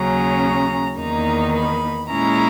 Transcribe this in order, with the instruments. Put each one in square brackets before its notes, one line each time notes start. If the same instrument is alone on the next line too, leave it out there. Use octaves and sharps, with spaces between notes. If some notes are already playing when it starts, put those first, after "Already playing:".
Already playing: [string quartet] D#2 C#3 F#3 C#4 A#5
E2 D#3 A#3 D#4 A#5
B5
A#2 G#3 C#4 E4 A#5